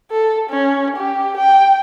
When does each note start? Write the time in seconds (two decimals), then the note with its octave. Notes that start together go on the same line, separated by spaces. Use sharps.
0.11 A4
0.50 C#4
0.96 G4
1.37 G5